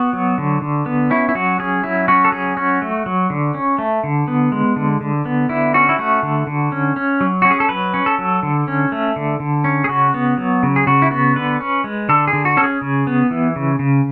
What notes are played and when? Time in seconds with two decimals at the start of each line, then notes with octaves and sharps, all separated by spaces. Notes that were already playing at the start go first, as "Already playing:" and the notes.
Already playing: B3 F#4
0.13 F#3
0.38 D3
0.62 D3
0.86 B3
1.11 C#4 E4
1.29 E4
1.35 F#3 F#4
1.59 C#4 G#4
1.84 F#3 E4
2.08 C#4 F#4
2.25 A4
2.32 F#3 G#4
2.57 C#4 F#4
2.82 A3
3.06 F#3
3.30 D3
3.55 C#4
3.78 A3
4.04 D3
4.28 B3
4.52 G#3
4.76 D3
5.01 D3
5.25 B3
5.49 D3 E4
5.74 C#4 F#4
5.89 E4
5.99 A3 F#4
6.23 D3
6.47 D3
6.72 C#4
6.96 C#4
7.21 F#3
7.42 C#4 F#4
7.51 G#4
7.60 A4
7.69 F#3 B4
7.94 C#4
8.06 A4
8.19 F#3
8.43 D3
8.68 C#4
8.92 A3
9.16 D3
9.40 D3
9.64 C#4
9.84 G#4
9.88 C#3 F#4
10.14 B3
10.37 F#3
10.63 C#3
10.76 G#4
10.87 C#3 F#4
11.02 E4
11.11 B3 F#4
11.35 D3 B4
11.60 C#4
11.84 G#3
12.09 D3 A4
12.28 G#4
12.33 D3
12.45 F#4
12.57 C#4 A4
12.64 G#4
12.81 C#3
13.07 B3
13.31 E3
13.56 C#3
13.79 C#3